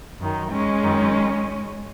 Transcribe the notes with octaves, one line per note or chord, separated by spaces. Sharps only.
F#2 D#3
G#3 C#4
F#2 D#3